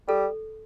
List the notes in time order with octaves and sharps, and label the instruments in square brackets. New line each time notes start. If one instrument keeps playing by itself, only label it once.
[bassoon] G3 [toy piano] A4